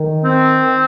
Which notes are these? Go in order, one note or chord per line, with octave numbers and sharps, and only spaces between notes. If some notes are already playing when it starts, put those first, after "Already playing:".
Already playing: D#3
C4